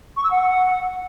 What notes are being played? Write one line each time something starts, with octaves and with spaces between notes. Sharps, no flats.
C#6
E6
F#5